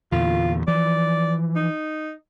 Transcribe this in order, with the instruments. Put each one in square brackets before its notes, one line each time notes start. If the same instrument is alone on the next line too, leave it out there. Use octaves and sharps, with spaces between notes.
[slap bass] E2 A#2 D3 [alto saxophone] F4
[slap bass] E3 F3 [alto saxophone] D5
[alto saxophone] D#4